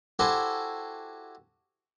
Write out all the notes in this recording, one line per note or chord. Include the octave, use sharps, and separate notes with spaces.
E4 F#4 G4 A4 C5 G#5